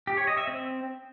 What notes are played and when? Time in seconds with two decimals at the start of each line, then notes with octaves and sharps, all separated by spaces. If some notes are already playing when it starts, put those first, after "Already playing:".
0.07 G4
0.17 C#5
0.27 D#5
0.37 E5
0.47 C4